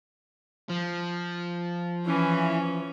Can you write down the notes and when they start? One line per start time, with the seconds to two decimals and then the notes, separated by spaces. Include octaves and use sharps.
0.70 F3
2.06 E3 C#4